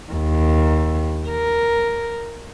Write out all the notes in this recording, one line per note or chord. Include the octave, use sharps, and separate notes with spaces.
D#2
A#4